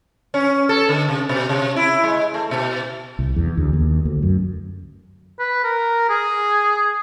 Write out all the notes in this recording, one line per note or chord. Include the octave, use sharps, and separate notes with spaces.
C#4
A4
D3
C3
B2
C3
E4
G#3
A3
B2
C2
E2
D2
D#2
D2
F#2
B4
A#4
G#4